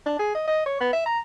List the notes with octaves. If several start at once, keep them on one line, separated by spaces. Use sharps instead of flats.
D4
G#4
D#5
D#5
C#5
B3
E5
A#5